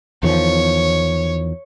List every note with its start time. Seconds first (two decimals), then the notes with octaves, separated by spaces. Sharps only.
0.23 E2 D#3 F3 C#5